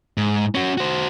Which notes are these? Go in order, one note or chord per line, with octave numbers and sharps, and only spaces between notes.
G#2
C#4 F#4
F#4 C5